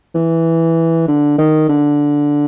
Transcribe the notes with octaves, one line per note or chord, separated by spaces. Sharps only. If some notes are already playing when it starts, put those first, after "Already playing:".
E3
D3
D#3
D3